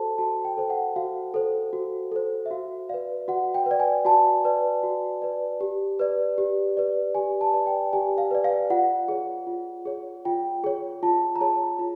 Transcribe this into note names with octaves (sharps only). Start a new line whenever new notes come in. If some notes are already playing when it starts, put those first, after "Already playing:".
Already playing: F#4 A4 C5 A5
F#4 A5
G5
A4 C5
F#5
F#4 F5
A4 C5
F#4
A4 C5
E5
F#4 F5
B4 D5 F5
F#4 F#5
G5
B4 D5
G#5
F#4 A5
B4 D5
F#4
B4 D5
G4
B4 D5
G4
B4 D5
G4 G#5
A5
B4 D5
G5
G4 G#5
F5
B4 D5
F5
F4 F#5
G#4 C#5
F4
G#4 C#5
F4 G5
G#4 C#5
F4 A5
A#5
G#4 C#5 A5
F4 A#5